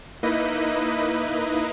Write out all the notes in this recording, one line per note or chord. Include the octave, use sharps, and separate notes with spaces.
A#3 D#4 E4 B4 D#5